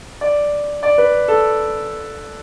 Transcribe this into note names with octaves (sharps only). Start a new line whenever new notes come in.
D5
D5
B4
A4